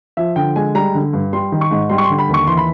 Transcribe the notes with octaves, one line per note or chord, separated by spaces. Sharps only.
F3 E5
D3 G5
G#3 G#5
G3 A#5
D3
G2
G3 C6
D#3
C#6
G#2
G3 C6
C#6
C6
D3
B5
D#2 C#6
E3 C6
B5